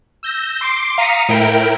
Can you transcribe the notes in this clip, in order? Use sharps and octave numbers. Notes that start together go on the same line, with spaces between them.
E6 G6 A#6
C6 D6 C7
F5 A#5 D#6 B6 C#7 D#7
A2 E4 A#4 G5 D7